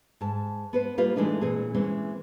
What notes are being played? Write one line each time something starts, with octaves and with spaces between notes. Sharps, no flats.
G#2 A5
B3 B4 C5
A2 G3 A#3 F4 G4 B4
E3 G#3 A3 D4 D#4
A#2 E3 B3 C4 G#4
E3 G#3 A#3 C4 C#4